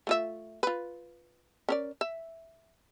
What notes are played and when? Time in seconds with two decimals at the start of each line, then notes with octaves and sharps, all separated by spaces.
0.07 A3 F4 E5
0.63 F4 B4
1.69 C#4 A#4 D5
2.01 E5